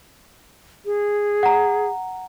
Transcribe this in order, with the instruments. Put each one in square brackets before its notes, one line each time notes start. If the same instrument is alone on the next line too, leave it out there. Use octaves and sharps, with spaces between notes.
[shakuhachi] G#4
[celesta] F#5 A#5